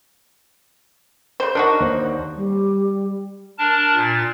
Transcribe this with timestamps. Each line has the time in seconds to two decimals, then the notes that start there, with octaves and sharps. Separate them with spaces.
1.40 C#3 C5
1.55 D4 D#4 F#4 A#4 D5
1.80 D#2 C5 D5
2.37 G3
3.58 D4 A#4 A5
3.95 A#2 A6